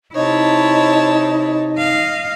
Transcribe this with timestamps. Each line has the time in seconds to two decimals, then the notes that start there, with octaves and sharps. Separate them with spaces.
0.15 C3 D#4 E4 C#5 D#5 A5
1.77 D#5 F5